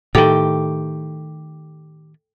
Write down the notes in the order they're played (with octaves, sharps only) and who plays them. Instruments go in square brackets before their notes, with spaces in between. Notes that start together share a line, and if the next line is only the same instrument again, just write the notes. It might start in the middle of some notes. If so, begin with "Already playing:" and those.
[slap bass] A2 D#3 [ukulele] G4 [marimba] A4